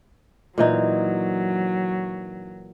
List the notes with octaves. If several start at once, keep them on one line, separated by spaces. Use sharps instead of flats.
A#2 E3 F#3 D#4